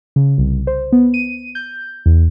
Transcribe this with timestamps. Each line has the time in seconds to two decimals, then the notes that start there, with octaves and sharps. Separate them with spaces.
0.16 C#3
0.38 C2
0.67 C5
0.92 B3
1.14 D#7
1.55 G6
2.06 E2